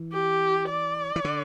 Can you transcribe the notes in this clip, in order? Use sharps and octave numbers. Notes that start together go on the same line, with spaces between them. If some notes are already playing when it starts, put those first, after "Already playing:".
Already playing: E3
G4
D5
E3
D3